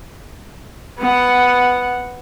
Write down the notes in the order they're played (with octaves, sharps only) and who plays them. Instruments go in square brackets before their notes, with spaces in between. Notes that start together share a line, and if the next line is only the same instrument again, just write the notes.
[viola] B3 F#5